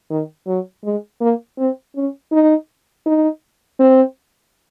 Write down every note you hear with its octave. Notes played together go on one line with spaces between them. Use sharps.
D#3
F#3
G#3
A#3
C4
C#4
D#4
D#4
C4